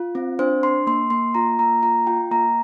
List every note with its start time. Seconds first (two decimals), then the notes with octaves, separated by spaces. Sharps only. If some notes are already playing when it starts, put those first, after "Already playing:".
Already playing: F4
0.15 C4
0.39 D4 C5
0.63 D4 C6
0.87 A#3 C6
1.10 A#3 C6
1.35 F4 A#5
1.59 A#3 A#5
1.83 F4 A#5
2.07 F4 G5
2.31 A#3 A#5